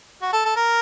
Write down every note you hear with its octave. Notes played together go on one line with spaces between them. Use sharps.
F#4
A4
A4
A#4